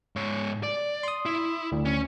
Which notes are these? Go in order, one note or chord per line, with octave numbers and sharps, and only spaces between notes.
G#2 C#5
D5
C6 D#6
E4
D2
C#4